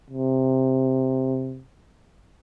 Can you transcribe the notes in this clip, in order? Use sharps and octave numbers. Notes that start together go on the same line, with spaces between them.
C3